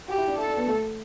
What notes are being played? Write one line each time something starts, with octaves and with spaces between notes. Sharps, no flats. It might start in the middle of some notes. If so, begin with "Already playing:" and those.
F#4 G4
E4
D4
E4 A4
D4
B3
A3